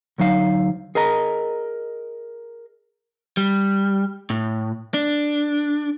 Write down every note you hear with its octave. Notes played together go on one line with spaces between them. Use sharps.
D2 F#3 D#4 F5
G#4 A#4 D#5 A#5
G3
A2
D4